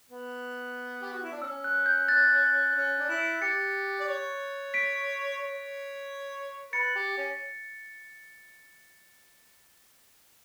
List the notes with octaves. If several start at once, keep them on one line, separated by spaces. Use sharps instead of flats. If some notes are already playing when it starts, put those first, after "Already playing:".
B3
G4
F#4
E4
D4
C#4 E6
F#6
G6
F#6 A6
C#4
D4
E4
G4 A6 C#7
D5
C#5
B6 D7
C#5
B4 A6 C#7
G4
C#4